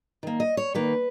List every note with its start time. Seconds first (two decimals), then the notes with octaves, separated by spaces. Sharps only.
0.23 D#3 A#3
0.40 D#5
0.57 C#5
0.74 D#3 A#3 B4